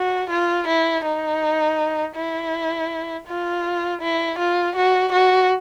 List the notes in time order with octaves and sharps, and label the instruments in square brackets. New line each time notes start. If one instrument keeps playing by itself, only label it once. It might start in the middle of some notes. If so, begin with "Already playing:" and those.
Already playing: [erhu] F#4
F4
E4
D#4
E4
F4
E4
F4
F#4
F#4